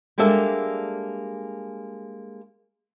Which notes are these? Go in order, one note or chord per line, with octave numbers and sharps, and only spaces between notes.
G3 G#3 A#3 D4 A4 E5